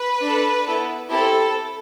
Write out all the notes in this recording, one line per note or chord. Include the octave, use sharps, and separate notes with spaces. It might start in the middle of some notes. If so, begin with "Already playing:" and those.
Already playing: B4
D4 A4
B3 E4 A4
C4 E4 G4 A4